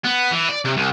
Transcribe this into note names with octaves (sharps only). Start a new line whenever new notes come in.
B3
E3
D5
C3
C2